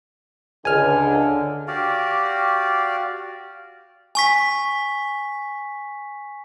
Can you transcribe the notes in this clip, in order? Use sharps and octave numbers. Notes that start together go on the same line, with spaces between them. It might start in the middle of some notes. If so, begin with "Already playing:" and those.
C#2 D3 G#5 F6
F#4 G4 D5 F5
G#5 C#6 B6